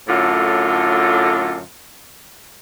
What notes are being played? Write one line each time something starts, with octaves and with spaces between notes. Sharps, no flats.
F#2 A2 D3 F4